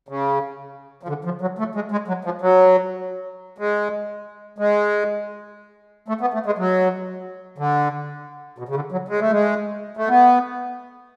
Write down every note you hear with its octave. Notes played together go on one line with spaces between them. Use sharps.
C#3
F3
D3
F3
F#3
A3
G#3
G#3
F#3
F3
F#3
G#3
G#3
A3
B3
A3
G#3
F#3
D3
B2
C#3
D3
F#3
G#3
A3
G#3
A3
B3